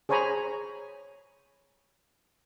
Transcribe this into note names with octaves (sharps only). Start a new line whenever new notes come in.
G#4 C5 C#5 G#5 A#5 B5